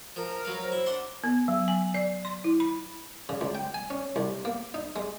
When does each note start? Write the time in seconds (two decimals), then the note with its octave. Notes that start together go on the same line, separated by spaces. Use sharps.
0.16 F3 A#4
0.45 F#3 B4 F5
0.58 C5 A#5
0.72 E4
0.86 D4 F#5 C6 D6
1.24 B3
1.48 F#3
1.68 G#5
1.94 D5
2.25 C6
2.44 E4
2.60 B5
3.29 C#3
3.41 C#2
3.55 G5
3.74 G#5
3.90 C#4
4.16 C2
4.45 A#3
4.74 D#4
4.96 G#3